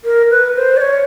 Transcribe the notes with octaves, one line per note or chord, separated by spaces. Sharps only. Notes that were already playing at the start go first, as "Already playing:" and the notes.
A#4
B4
C5
D5
C#5